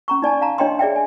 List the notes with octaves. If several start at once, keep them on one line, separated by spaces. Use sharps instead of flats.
C#4 A#5 C#6
D#4 D5 G#5 A5
F5 A5 A#5
D4 C#5 D#5 G5 A#5 C6
G#4 D5 E5 G5
C#5 G#5